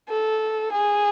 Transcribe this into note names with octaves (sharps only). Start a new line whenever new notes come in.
A4
G#4